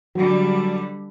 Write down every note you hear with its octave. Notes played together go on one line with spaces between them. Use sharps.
D3 F#3 G3